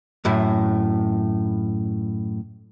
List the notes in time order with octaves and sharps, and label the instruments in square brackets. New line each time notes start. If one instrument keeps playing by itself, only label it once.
[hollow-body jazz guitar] F#2 A2 E4